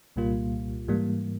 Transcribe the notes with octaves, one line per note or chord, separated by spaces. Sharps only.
C2 A#2 G3 A#3 F4
G#2 E3 G3 A#3